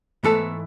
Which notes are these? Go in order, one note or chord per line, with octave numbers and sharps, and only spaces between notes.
G#2 E3 A3 B3 A4